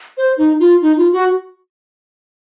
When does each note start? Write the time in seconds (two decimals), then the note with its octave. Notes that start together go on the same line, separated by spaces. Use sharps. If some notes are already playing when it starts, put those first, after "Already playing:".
0.17 C5
0.38 D#4
0.60 F4
0.82 D#4
0.97 F4
1.13 F#4